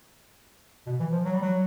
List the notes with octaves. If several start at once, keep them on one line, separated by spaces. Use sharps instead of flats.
B2
E3
F3
F#3
G3
F#3